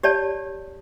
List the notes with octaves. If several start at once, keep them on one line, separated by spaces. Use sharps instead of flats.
G4 C#5 D5 A5